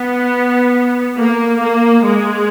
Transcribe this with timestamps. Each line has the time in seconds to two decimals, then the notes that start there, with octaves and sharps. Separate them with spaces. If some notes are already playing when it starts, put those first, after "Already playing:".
Already playing: B3
1.17 A#3
1.61 A#3
2.03 G#3